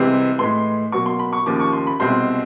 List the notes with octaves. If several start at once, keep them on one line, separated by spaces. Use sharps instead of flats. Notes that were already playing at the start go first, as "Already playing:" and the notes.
Already playing: C2 C3 E3 G#3 C4
A2 E3 G#3 C6
B2 F#3 A#3 C#6
C6
B5
C#6
D#2 C#3 F3 A#3 D6
C#6
C6
B5
C2 B2 G#3 C4 C6